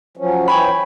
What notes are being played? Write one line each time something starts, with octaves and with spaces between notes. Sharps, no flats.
F3 F#3 C#4
E3 C#5 G5 G#5 B5